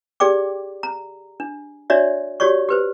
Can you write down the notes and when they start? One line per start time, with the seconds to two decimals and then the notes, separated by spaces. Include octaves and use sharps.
0.20 G4 G#4 D5 G5 D6
0.83 A#5
1.40 D4
1.90 D4 F#4 C#5 D5 E5
2.40 F#4 G4 C#5 D5 C#6
2.69 G4 B4 C5